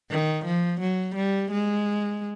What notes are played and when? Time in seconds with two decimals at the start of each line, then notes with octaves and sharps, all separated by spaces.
0.11 D#3
0.45 F3
0.80 F#3
1.16 G3
1.51 G#3